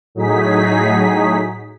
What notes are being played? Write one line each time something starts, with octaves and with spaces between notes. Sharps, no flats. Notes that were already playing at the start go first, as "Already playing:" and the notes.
A2 F#3 D#4 G#4 B6